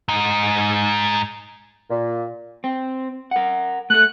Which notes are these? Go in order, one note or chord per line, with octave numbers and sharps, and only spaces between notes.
G#2 D#4
A#2
C4
A#4 F#5
A3 A4 F#6